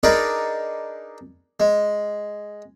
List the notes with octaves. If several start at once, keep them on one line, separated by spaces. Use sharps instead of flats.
D4 D#4 G#4 A#4 B4 D5
G#3